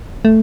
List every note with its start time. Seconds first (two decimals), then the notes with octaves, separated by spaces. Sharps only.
0.25 A3